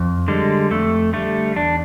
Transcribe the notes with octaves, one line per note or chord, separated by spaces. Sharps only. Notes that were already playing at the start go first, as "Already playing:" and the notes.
Already playing: F2
D3 G3 G#3
F2 A3
D3 G3 A3
E2 D4